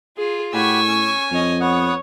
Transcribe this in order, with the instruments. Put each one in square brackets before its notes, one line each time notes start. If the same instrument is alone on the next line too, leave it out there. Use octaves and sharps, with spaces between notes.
[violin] F4 [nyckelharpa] G#4
[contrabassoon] A2 [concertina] F#4 G4 B5 [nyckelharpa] G#5 [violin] C#6 E6
[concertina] C#4
[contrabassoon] F2 [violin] C#5 D#5
[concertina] B3 F#5 D#6 [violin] C#5